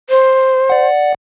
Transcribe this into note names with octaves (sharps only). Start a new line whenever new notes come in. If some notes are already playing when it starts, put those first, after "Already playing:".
C5
D5 F#5